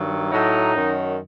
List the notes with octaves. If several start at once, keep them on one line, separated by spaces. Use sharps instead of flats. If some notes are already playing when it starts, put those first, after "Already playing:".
Already playing: G2 D#3 F#3
A2 F#3 D#4
F#2 D#3 F#3